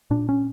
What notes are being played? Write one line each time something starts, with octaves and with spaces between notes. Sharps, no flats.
A#2 D4
C#4